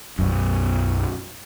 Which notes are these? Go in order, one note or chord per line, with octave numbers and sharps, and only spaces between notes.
B1 F#2